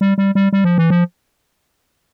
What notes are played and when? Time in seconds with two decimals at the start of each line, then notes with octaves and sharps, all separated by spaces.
0.01 G3
0.18 G3
0.35 G3
0.53 G3
0.64 F3
0.78 E3
0.90 F3